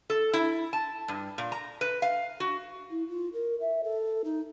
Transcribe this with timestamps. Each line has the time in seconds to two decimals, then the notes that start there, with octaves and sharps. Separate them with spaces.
0.10 A4
0.33 E4
0.73 A5
1.08 G2
1.38 A#2
1.52 A#5
1.81 B4
2.02 F5
2.40 F#4
2.90 E4
3.08 F4
3.33 A#4
3.60 E5
3.83 A4
4.24 D#4